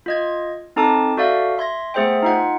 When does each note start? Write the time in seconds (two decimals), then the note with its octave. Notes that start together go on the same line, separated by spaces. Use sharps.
0.06 F4 D#5 G#6
0.76 C4 D#4 A4 A5 D6
1.17 F#4 A4 D5 E5 F5
1.58 E5 C6 G#6 A#6
1.94 A3 B3 G#4 C5 E5 G5
2.23 D#4 F4 F#5